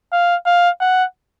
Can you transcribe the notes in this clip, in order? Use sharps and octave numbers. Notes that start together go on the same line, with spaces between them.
F5
F5
F#5